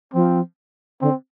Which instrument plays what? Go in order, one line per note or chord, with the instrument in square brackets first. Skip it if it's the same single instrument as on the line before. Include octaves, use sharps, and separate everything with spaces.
[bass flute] F3 [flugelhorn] C4
[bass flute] D3 [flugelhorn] C4